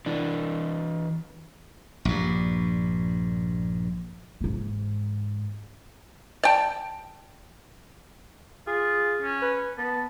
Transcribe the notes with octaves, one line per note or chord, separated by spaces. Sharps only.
E3 D4
A#1 G2
G#2 E3
D5 G5 A5
F4 G#4
C#4
B4
B3 A5